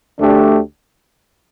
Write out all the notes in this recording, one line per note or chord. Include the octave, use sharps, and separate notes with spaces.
D2 D3 A3 D4 G4